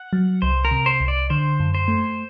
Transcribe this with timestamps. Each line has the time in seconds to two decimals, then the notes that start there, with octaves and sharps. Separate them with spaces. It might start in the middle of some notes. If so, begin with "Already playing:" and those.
Already playing: F#5
0.13 F#3
0.42 C2 C5
0.65 A#4
0.71 C3
0.86 C5
1.00 C2
1.08 D5
1.30 D3 C5
1.60 F#2
1.75 C5
1.88 A3